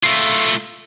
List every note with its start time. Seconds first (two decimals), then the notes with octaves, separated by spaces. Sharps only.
0.03 A3 F4